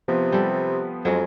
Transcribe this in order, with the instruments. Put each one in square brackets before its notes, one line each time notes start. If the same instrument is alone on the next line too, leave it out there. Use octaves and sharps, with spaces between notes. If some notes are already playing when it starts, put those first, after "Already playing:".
[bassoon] C3 [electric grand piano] F3 B3 B4
[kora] G3 A4
[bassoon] F2 [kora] F#3 G#3